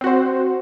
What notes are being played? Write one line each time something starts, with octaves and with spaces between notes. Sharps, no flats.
C4 F#4 C5